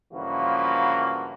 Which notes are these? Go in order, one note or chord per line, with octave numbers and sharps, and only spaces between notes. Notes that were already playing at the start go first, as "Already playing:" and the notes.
G2 C#3 E3 F3 A#3 F#4